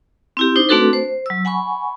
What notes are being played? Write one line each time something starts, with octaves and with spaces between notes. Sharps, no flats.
C4 E4 G4
D4 D#4 C5
A3 C4 D4 F#4 A4 B4
C5
F#3 E6
F#5 G#5 B5 C#6